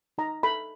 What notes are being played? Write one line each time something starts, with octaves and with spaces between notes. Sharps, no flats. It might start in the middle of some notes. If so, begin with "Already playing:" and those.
D#4 A#5
A4 B5